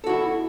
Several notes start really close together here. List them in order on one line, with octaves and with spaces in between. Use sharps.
A4 F#4 E4